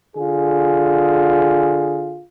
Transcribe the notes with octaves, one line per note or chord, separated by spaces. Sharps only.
D3 F4 G#4